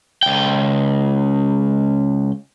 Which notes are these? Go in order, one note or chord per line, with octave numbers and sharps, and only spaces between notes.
C#2 G5